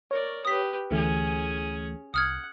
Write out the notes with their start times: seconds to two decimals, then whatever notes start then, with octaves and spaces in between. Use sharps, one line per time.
0.11 A#4 C#5 D5
0.45 G4 B4 D#6 B6
0.91 D2 E3 A3 C#4 G#4
2.14 C2 F#5 D#6 F6 G#6